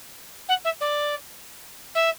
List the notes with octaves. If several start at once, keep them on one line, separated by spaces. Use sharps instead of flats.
F#5
E5
D5
E5